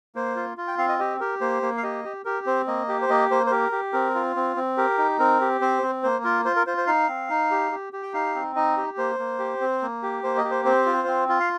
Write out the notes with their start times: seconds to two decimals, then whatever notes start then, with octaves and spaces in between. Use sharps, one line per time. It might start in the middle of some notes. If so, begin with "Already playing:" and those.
0.15 A#3 C5
0.36 F4
0.58 F4
0.67 G5
0.78 C4 F5
0.89 D#5
0.99 G4 D#5
1.20 G4 A#4
1.41 A#3 C5
1.62 A#3
1.77 F5
1.83 G4 D#5
2.04 G4
2.25 G4 A#4
2.46 C4 C5
2.67 A#3 D#5
2.88 G4
3.02 C5
3.09 A#3 D#5
3.31 A#3 C5
3.46 C5
3.51 G4 A#4
3.72 G4
3.93 C4 A#4
4.15 F4
4.36 C4
4.57 C4
4.77 G4 A#4
4.98 D#4
5.19 C4 A#4
5.41 G4
5.61 C4 C5
5.82 C4
6.03 A#3 C5
6.24 F4 A#4
6.45 F4 C5
6.56 A#4
6.67 F4 C5
6.77 C5
6.87 D#4 F5
7.08 C4
7.30 D#4
7.51 G4
7.72 G4
7.93 G4
8.03 G5
8.14 D#4 F5
8.35 C4
8.56 D#4 D#5
8.77 G4
8.97 A#3 C5
9.19 A#3
9.39 G4
9.61 C4
9.82 A#3
10.03 G4
10.24 A#3 C5
10.37 D#5
10.44 G4
10.51 C5
10.65 C4 C5
10.86 F4
11.08 C4
11.29 F4
11.40 F5